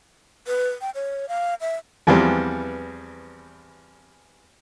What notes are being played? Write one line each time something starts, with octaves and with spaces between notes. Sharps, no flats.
B4
G5
C#5
F5
E5
E2 E3 F3 G3 B3 C4